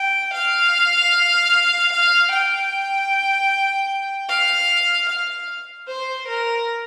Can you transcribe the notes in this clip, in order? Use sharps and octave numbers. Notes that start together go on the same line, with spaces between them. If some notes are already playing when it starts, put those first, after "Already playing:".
Already playing: G5
F5
F5
G5
F5
F5
C5
A#4